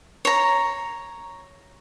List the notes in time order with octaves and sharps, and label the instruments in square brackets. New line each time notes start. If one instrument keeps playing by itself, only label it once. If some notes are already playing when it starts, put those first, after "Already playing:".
[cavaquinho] C#5 A#5